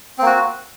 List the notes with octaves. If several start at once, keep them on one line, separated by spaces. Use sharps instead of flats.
A#3 C4 F#4